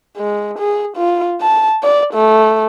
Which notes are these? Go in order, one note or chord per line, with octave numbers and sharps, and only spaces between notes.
G#3
G#4
F4
A5
D5
A3